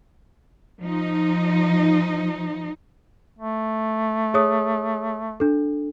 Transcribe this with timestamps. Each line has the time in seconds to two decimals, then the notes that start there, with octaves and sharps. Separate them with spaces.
0.80 F3 D#4
3.39 A3
4.34 G#4 C#5 D#6
5.40 D4 A4